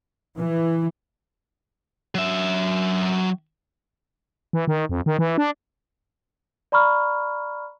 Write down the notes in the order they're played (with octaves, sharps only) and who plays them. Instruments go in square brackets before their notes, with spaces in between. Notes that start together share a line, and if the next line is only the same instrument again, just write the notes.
[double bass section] E3
[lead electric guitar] F#3 E5
[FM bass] E3
D#3
F2
D#3
E3
D4
[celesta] D5 A#5 B5 C#6 F6